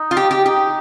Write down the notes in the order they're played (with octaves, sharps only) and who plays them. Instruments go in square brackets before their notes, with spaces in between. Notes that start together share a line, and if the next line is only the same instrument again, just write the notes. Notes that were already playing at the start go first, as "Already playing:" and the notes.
Already playing: [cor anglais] D#4
[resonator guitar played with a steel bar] F4
G4
G4
[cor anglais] D#4 [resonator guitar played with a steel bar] G4